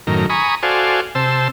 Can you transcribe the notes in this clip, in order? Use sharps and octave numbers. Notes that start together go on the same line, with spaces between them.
F#2 A2 D#3 A#4
G#5 A#5 B5 C#6 D#6
F#4 A4 C5 D5 F5 G#5
C3 C5 A5 E6